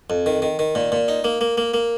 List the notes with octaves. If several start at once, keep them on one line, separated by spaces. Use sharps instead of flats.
F2
D#3
D#3
D#3
A#2
A#2
D#4
A#3
A#3
A#3
A#3